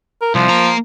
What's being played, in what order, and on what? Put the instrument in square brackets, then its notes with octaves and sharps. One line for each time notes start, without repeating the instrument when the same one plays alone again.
[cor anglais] A#4
[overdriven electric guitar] C2 [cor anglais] F3
[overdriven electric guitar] A#3 A#5